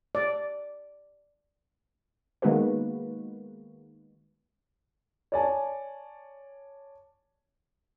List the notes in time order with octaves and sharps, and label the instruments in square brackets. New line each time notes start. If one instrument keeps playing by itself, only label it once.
[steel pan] D5
[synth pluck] D#3 G#3 A#3 B3 F#4 B4
[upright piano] C#5 D5 G#5 A5